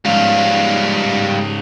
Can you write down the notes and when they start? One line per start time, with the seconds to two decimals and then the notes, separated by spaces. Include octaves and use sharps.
0.05 C#2 G#2 G3 F5